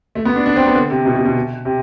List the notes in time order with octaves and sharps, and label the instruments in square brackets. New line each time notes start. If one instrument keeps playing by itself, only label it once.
[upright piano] A3
B3
D4
D4
C4
B3
D3
C3
B2
B2
B2
C3